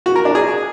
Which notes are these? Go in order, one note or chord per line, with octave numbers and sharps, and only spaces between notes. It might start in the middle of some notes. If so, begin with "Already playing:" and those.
F#4
A#4
D4
G#4